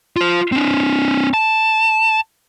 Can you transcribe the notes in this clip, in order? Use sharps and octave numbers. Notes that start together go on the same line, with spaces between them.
F4 C5
C4 D4
A5